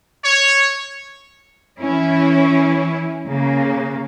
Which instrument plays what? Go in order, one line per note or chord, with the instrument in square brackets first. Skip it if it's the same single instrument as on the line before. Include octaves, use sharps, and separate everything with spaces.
[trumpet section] C#5
[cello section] E3 C#4 E4
C#3 A#3